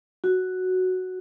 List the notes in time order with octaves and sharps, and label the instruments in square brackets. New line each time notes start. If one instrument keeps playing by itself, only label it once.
[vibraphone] F#4